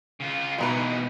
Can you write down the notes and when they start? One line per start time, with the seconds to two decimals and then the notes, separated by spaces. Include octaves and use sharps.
0.20 C#3 F4
0.59 G#2 B2 E3 G#3 D#4 B4